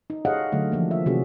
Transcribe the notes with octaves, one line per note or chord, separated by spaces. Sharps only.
D#4
G4 G#4 C#5 D#5 F5 F#5
D3 F#3 A3
E3 F3 A#3
E5
C3 D#3 A#3 C#4 F#4 G#4